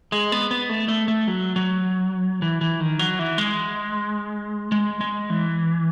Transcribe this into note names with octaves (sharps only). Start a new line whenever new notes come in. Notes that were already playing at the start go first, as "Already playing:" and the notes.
G#3
B3
B3
A3
A3
A3
F#3
F#3
E3
E3
D#3
F#3
E3
G#3
G#3
G#3
E3